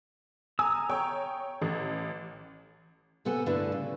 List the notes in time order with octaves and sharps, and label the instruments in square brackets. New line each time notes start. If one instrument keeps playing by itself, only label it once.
[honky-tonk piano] G#5 [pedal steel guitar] A#5 D#6 E6
[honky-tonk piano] C#5 G5
A1
[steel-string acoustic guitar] C3 B3 A4 F#5 G#5
G2 D3 A3 E4 B4 D5
C#3